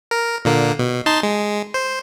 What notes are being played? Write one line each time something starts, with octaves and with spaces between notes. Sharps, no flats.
A#4
A#2 D3 A#3
B2
D#4 A5 C6
G#3
C5